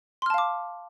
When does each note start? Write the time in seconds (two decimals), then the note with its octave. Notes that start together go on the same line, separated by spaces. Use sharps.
0.22 C6
0.26 F6
0.30 A5
0.34 F5
0.38 D6